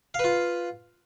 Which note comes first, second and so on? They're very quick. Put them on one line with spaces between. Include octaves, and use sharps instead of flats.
F5 B4 F4